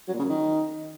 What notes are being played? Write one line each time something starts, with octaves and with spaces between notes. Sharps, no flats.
F#3
A#2
C#3
F#2
D#3